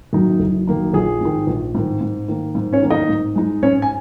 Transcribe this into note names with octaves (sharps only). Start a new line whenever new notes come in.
F#2 D#3 A#3 D#4
F#1
F#2 D#3 A#3 D#4
A#1 G#4
G#2 D#3
A#1
G#2 D#3
G#2
D#3 A#3
G#2
C#4 C#5
D#3 A#3
D#4 D#5
G#2
G#3 D#4
G#2 C#4 C#5
G#5